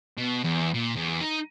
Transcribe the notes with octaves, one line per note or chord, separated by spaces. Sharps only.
B2
E2
A#2
E2
D#4